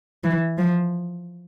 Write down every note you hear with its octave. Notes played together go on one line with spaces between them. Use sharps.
E3
F3